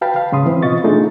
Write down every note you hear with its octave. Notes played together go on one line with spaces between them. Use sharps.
F#4 B4 F5 G5 A5 B5
F5
G#2 C#3 B5 C6 D#6
E3 C4
B2 F4 D#5 C#6 A6
A3 D4 D#4 F4 G#4